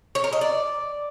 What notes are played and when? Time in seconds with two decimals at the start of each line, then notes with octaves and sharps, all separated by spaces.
0.15 C#5
0.24 A#4
0.33 D#5
0.41 D5